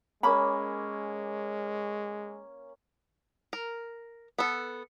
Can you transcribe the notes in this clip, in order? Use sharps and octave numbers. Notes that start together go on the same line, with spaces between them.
G#3 A#3 C#4 A#4 B5
A#4
B3 A4